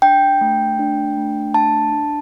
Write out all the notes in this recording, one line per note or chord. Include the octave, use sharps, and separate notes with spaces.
D4 G5
A3
D4
A3
D4 A5
D4